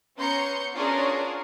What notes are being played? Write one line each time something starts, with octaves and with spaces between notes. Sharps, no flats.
B3 C#4 A#5 C6 G6 C#7
C#4 D4 F4 F#4 G#4 A#4